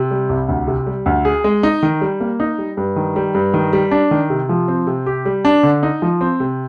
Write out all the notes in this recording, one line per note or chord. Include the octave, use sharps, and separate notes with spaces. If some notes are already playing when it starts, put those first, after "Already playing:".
Already playing: C3
G3
C2
D2
C3
G3
D2
G#4
G#3
D#4
D#3
G3
A#3
D#4
G3
G2
D#3
G3
G2
D#3
G3
D4
D#3
C3
F3
C4
C3
G4
G3
D4
D3
D#4
F3
C4
C3